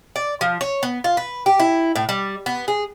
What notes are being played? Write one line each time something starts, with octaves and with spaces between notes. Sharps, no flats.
D5
F3
C#5
B3
F4
B4
G4
E4
A2
G3
B3
G#4